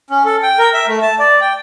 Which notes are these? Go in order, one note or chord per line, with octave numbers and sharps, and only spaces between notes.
C#4
A4
G5
A#4
E5
A3
A5
D5
G5